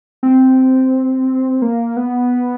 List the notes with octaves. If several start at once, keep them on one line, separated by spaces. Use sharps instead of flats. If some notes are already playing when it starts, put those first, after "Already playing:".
C4
A#3
B3